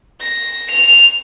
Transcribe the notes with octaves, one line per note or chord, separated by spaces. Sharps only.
A#6
F7